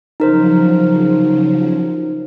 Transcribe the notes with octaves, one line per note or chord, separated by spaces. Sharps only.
C#3 F3 F#3 D#4 A#4 C5